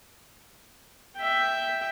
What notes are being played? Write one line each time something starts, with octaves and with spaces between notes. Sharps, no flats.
E5 G5